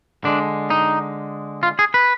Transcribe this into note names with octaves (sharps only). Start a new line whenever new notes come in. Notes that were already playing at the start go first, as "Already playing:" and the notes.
D3 G#3 D4
D#4
F4
G#4
B4